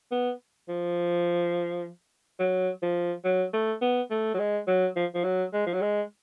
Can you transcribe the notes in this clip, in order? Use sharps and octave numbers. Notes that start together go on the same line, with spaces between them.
B3
F3
F#3
F3
F#3
A3
B3
A3
F#3
G#3
F#3
F3
F3
F#3
G#3
F3
F#3
G#3